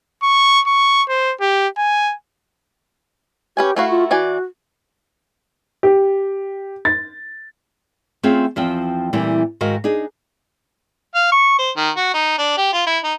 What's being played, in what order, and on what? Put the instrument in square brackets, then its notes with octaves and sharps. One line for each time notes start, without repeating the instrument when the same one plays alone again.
[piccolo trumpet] C#6
C#6
C5
G4
G#5
[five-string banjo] C#4 B4 G#5 [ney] G4
[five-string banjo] A3 E4 F#4 [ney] F5
[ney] F4
[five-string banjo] E3 D5 G#5 [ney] F#4
[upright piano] G4
A6
[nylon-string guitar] A3 C4 C#4 F4 G#4
E2 F3 C4 G5
A#2 E3 G3 A3 C4 E4
G#2 D#3 F#4 A#4 D#5 F5
D4 D#4 G#4
[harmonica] F5
C#6
C5
D#3
F#4
D#4
D4
G4
F4
E4
D#4